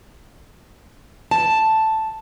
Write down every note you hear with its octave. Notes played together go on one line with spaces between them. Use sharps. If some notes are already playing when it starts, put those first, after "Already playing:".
A5